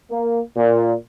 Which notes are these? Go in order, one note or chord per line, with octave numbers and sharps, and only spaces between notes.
A#3
A#2